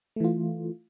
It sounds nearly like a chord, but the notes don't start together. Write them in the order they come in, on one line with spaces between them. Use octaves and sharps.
A3 E3 F4